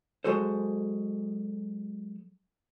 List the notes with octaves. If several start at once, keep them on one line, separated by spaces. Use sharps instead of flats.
F#3 G#3 F#4 A4 C5